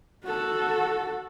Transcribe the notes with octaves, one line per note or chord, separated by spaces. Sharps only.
F#4 A4